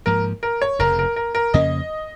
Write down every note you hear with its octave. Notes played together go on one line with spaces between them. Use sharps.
G#2 F3 A#3 A#4
A#4
C#5
F1 F2 C#3 A#4
A#4
A#4
A#4
F2 C#3 A#3 C#4 D#5